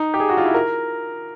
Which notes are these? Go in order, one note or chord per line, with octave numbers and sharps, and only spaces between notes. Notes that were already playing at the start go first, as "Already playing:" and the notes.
Already playing: D#4
G4
G#4
F#4
F4
E4
A#4